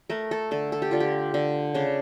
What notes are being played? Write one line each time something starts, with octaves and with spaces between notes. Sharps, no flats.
A3 A#4
A4
D3 A4
A4
G4
D3 F4
G4
D3
C#3 D4